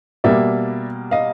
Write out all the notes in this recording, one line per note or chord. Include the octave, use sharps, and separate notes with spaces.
B2 G3 A#3 D5 E5
D#5 F5